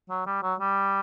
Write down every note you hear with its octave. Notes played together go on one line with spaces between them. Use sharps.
F#3
G3
F#3
G3